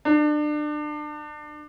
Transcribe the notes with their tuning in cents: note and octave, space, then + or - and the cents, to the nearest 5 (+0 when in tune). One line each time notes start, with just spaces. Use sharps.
D4 +30